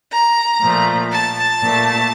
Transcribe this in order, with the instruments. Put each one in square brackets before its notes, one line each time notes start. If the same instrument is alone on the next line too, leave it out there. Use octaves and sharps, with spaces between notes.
[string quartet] A#5
A#2 F3 A3
A5
A#2 A3